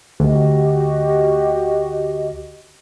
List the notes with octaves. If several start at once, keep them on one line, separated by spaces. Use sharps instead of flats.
D2 F#4 G4 D#5